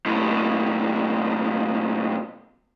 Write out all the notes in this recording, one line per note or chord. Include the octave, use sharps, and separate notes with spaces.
B1 A2